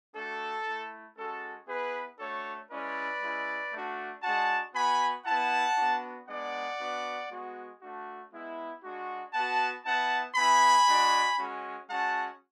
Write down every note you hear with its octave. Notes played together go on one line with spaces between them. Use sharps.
A3 D4 F#4 A4
A3 E4
G#3 C#4 F#4 A4
B3 E4 G#4 B4
A3 D4 F#4 A4 C#5
G#3 C#4 E4 B4 D5
G#3 C#4 E4
A3 D4 F#4
G#3 D4 F#4 F#5 A5
B3 F#4 G#5 B5
B3 E4 F#5 A5
B3 D4 F#4
G#3 B3 D4 D5 F#5
B3 D4 F#4
G#3 B3 F#4
A3 D4 F#4
G#3 B3 E4
G#3 D4 F#4
B3 F#4 F#5 A5
B3 E4 F#5 A5
B3 E4 G#5 B5
G#3 D4 F#4
G#3 C#4 F#4
G#3 C#4 F#4 F#5 A5